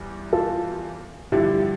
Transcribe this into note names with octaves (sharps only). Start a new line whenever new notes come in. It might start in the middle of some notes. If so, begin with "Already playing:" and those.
Already playing: E2 G3
F4 A4
G2 D3 F3 E4 G4